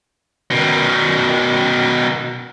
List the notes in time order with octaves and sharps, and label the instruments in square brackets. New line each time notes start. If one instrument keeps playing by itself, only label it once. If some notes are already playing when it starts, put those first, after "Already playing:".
[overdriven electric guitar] B2 D#3